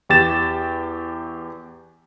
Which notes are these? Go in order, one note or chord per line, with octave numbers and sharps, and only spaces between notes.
E2 G4 G5 A6 E7